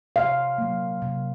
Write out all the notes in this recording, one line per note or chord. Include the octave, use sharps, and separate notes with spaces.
C3 F5
F#3 A#3
C3